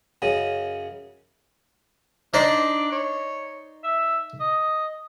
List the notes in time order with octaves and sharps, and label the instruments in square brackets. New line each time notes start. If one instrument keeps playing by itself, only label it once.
[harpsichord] F#2 C#3 D#5
[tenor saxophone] D4 [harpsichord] D#4 C5 D5
[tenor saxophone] C#5
E5
D#5